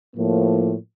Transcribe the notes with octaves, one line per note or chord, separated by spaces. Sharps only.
A2 F3 A#3